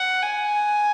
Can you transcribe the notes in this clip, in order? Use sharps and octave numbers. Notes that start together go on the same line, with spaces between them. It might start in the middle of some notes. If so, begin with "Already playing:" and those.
Already playing: F#5
G#5